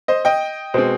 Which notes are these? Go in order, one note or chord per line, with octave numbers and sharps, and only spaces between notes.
C5 D#5
D#5 G5
B2 G#3 C4 C5